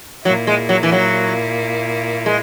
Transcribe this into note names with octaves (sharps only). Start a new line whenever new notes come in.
A#2 F#3 A#3 E4
G#3
F#3
E3
F#3
G#3